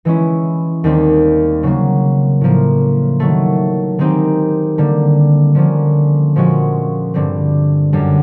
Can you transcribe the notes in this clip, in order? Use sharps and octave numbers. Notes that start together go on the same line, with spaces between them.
E3 G#3 C#4 E4
D#2 D#3 G3 C4
C#3 F#3 A#3
A2 F3 A#3
D#3 F#3 A3
D#3 G#3 C4 D#4 G4
D3 G3 A#3
D3 F3 A#3 C#4
A#2 F3 G#3 C#4 F#4
G2 D3 G3 C4
F#2 D3 G3